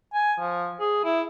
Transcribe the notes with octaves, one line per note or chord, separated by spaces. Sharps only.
G#5
F3
G#4
E4